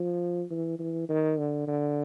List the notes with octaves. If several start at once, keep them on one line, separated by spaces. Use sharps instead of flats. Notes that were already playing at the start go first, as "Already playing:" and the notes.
Already playing: F3
E3
E3
D#3
D3
D3